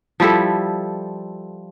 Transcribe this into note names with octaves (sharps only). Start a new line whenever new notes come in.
F3 G3 E4 A4